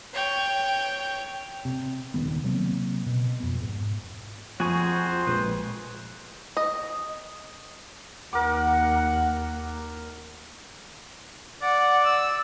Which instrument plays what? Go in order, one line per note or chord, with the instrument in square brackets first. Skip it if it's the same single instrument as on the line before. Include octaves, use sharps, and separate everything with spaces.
[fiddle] C#5 G5
[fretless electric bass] C3
D#1 C#2 D#3 B3
C3 F#3 A#3 C4
B2
F2 B3
G#2
[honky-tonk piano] F2 G#5 D#7 [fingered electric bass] F3 [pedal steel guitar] F#4 G#4 C#6 [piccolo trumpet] C5
[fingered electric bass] A#1 A#2 G#3 [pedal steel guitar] B4
[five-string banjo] D#5
[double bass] D#2 [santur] A#4 D6 [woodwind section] F#5
[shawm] D5 [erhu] F#5
[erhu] E6